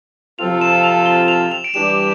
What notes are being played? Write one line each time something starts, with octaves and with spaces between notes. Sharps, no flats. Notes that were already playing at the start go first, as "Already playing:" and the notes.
C3 F3 C4 F4 A4 F7
E7
F7
G7
F7
F7
D7
E3 G3 D4 G4 E7